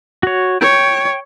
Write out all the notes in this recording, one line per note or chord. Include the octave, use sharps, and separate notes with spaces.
F#4 C#5
C#5 G5